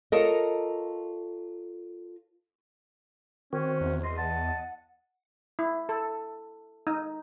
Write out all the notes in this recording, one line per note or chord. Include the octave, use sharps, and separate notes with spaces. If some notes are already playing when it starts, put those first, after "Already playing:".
F4 A4 A#4 C#5 D#5
D#3 C4 C#4 F#4 C5
E2
D#5 C6
F#5 A5
E4
A4
D#4